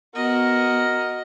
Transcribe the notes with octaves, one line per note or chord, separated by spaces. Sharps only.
B3 F#4 A#4 D#5